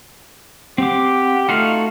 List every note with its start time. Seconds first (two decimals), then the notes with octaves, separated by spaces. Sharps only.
0.78 C4 G4 F#5 D6
1.49 A3 D#4 F4 F#4 F5